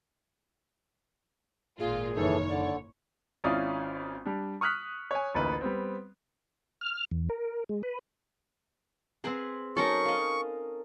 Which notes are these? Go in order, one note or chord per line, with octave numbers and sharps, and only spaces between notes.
G#1 A#2 F4 G#4
F#1 D#3 E3 A4 C#5
D3 D5
G#1 C#4 E4 F4 D5 D#6
G3 D4
C#6 D#6 F6 F#6 B6
C#5 G#5
A1 D2 A#3 D#4 B4
G3 B3 C4
F6
E2
A#4
G#3
B4
C4 G#4 A#4 B4 F#5
F#3 C#4 D#4 A4 A#4 A#5 C#6
D#5 F5